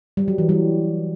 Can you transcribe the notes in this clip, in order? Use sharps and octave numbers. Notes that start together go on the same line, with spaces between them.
G3
F#3
E3
G3